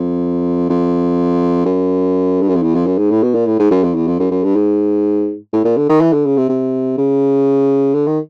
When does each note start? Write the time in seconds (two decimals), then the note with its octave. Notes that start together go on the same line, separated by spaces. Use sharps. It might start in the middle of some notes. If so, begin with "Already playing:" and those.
Already playing: F2
0.69 F2
1.65 F#2
2.41 G2
2.49 F#2
2.55 F2
2.63 E2
2.75 F2
2.86 F#2
2.98 G#2
3.11 A2
3.23 B2
3.34 A#2
3.47 A2
3.60 G#2
3.71 F#2
3.83 F2
3.95 E2
4.07 F2
4.19 F#2
4.31 F#2
4.43 G2
4.56 G#2
5.53 A2
5.65 A#2
5.77 D3
5.89 D#3
6.01 E3
6.13 D3
6.26 C#3
6.37 C3
6.49 C3
6.98 C#3
7.94 D3
8.07 D#3